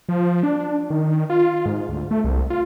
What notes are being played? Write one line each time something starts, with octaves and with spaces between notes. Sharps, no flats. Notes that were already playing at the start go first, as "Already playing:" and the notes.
F3
D4
D#3
F4
G#2
D2
A3
C2
F4